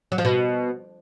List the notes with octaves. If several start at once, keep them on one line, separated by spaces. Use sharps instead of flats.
F#3
F3
B2